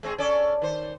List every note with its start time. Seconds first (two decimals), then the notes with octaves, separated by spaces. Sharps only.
0.03 G#3 C4 G#4
0.18 C#4 A4 D5
0.62 D#3 C5